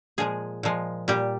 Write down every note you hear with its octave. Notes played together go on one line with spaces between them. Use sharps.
A#2 F3 G#3 G#4
A#2 F3 G#3
A#2 G3 G4